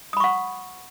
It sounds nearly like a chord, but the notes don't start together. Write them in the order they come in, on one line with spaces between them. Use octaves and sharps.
D#6 B5 C#6 F#5